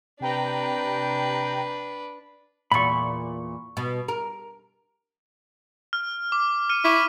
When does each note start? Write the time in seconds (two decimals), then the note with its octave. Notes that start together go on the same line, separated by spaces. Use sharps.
0.20 C3 D4 B4 G5 A#5
2.72 E2 A#2 B5 C#6
3.77 B2
4.08 A#4
5.93 F6
6.32 D6
6.70 F6 C#7 D#7
6.85 E4 C#6 D6 D#7